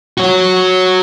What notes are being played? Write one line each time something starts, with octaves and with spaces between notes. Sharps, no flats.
F#4 C#5